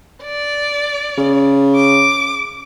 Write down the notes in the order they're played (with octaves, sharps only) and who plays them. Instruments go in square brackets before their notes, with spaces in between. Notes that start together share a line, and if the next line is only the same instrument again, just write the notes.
[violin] D5
[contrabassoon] C#3
[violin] D6